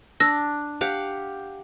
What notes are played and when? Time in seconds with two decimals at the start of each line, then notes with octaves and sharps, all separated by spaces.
0.20 D4 E6 A#6
0.81 G4 F5 F#5